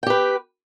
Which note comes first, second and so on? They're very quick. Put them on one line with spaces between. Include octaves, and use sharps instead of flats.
G5 G4 B4